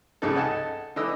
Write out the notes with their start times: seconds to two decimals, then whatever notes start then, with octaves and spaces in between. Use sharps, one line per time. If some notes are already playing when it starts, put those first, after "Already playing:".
0.22 C2 G#2 C#3 D#4 A4
0.35 D#4 A4 F#5 G#5 A5
0.96 D3 E3 D#5 E6